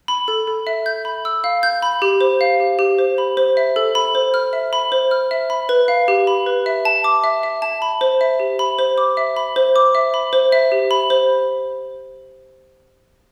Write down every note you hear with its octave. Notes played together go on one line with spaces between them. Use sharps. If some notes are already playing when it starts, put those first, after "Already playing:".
B5
A4
A4
E5
G6
B5
E6
F5
G6
B5
G4
C5
F5
G4
G4
C5
B5
C5
E5
A4
B5
C5
F6
E5
B5
C5
F6
E5
B5
B4
F5
G4
B5
B4
E5
A5
D6
E5
E5
A5
B5
C5
E5
G4
B5
C5
D6
E5
B5
C5
D6
E5
B5
C5
E5
G4
B5
C5